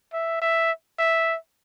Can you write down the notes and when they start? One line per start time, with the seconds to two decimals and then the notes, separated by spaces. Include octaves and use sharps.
0.13 E5
0.42 E5
0.99 E5